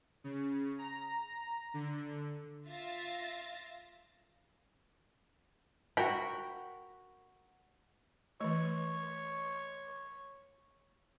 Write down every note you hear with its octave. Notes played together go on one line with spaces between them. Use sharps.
C#3
A#5
D3
F4 E5 F5 A6 A#6
F#4 A#4 G5 B5
E3 A3 C#5